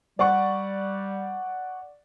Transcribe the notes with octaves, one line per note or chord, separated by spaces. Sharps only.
G3 D5 F#5 C#6